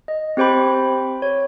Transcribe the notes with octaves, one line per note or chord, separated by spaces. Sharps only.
D#5
C4 G4 C5 G5 B5
C#5